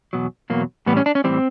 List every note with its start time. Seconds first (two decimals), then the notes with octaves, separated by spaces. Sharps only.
0.13 E2 B2 F#3
0.50 E2 B2 F#3 A#3
0.86 A2 E3 G3 B3
0.97 C#4
1.06 D4
1.15 C#4
1.24 A2 E3 G3 C4